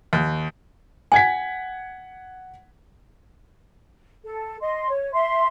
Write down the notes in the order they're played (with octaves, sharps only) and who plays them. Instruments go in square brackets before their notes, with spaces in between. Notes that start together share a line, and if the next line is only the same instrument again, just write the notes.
[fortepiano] D#2
[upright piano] F#5 G#6 B6 [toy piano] G#5
[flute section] A4
D#5 C6
C#5
E5 C6